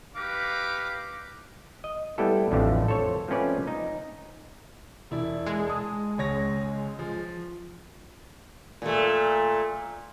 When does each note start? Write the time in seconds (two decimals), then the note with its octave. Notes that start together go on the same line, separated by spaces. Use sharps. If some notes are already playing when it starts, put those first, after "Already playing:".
0.15 D#4 G4 B4 F5 D6
1.84 D#5
2.18 G3 A3 B3 E4 G4 A4
2.51 A1 F2 A2 D3 A3
2.88 A4 C5 C#5
3.28 F3 A3 C4 C#4 B4 D5
3.67 D#4
5.11 E1 E4 D5
5.46 G#3
5.67 A5 D#6
6.18 C#2 C#5 A#6
6.99 F3
8.82 A#2 A3